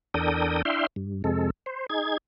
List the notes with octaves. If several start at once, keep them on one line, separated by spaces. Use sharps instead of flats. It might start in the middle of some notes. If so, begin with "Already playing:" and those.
E2 D4 A4 A#4 G5 D#6
D4 E4 E5 F5 G5 C6
G2
F2 C3 G#3 A4
C5
D#4 G#4 G#6